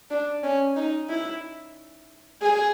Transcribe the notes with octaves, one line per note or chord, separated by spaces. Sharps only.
D4
C#4
D#4
E4
G#4